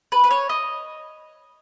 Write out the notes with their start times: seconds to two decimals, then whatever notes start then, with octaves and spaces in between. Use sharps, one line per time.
0.12 B4
0.24 B4
0.31 C#5
0.49 D#5